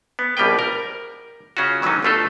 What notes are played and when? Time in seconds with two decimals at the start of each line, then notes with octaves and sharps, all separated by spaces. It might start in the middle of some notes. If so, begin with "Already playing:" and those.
0.19 B3
0.37 A#1 B2 G3 A#3 B4 G5
0.59 A#4
1.57 C#3 C#4 F4 F#4
1.82 D#3 E3 F#3 A3 C#4 D#4
2.02 G1 B2 A3 F4 A4